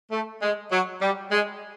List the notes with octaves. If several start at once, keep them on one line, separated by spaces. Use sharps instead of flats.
A3
G#3
F#3
G3
G#3